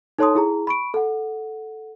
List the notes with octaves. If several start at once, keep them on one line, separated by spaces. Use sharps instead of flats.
D#4 A4 C#5 A5 C6 D#6
E4 G#4 A#5
B5 C#6 D7
A4 F#5